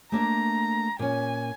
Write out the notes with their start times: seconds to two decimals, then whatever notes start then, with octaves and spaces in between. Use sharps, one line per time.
0.12 A3 A#3 D4 A#5
0.99 A#2 C#4 G#5